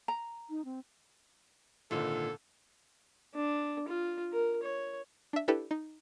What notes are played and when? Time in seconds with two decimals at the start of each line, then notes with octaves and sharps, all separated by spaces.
0.08 A#5
0.50 D#4
0.65 C4
1.91 G#1 A#2 D3 A4
3.35 D4
3.88 F4
4.33 A#4
4.63 C#5
5.33 D4 E5
5.48 D4 E4 G4 A4 B4 D5
5.71 D#4